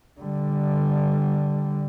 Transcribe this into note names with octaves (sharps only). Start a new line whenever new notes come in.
D3 G3